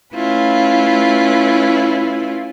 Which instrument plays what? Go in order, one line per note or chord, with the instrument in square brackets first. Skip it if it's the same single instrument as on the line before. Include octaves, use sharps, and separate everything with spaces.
[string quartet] A3 C#4 E4 F4 B4